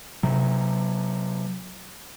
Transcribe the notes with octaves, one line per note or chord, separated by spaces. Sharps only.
C3 F#3